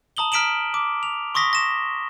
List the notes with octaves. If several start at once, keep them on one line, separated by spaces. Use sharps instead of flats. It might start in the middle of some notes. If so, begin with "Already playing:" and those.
A5 A#5 D#6 F#7 G7
A#5 F6 B6 D7 E7 F#7
D6
F7
C6 C#6 D#6 A#6 B6 G7
A#6 E7